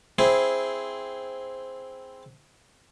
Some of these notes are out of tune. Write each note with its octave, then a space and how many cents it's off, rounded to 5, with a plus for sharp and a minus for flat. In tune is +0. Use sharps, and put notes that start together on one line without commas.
C4 +0 E4 +0 G#4 +0